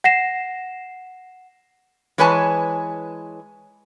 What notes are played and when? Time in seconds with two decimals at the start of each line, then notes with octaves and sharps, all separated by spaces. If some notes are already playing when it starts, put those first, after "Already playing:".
0.04 F#5 A#6 C7 E7
2.18 E3 G#3 B4 C#5 G#5 A5